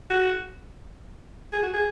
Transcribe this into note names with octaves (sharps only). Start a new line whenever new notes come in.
F#4
G#4
F#4
G#4